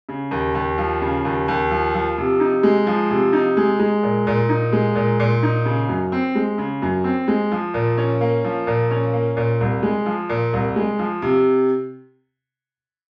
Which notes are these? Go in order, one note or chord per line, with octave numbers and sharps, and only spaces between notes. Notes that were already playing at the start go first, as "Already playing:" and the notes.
C#3
D#2
D#2
F3
C#3
D#2
D#2
F3
F3
C3
D#4
G#3
F3
C3
D#4
G#3
G#3
A#2
A#2
D#4
G#3
A#2
A#2
D#4
C#3
F#2
C4
G#3
C#3
F#2
C4
G#3
F3
A#2
C#4
A#3
F3
A#2
C#4
A#3
A#2
C2
G#3
F3
A#2
C2
G#3
F3
C3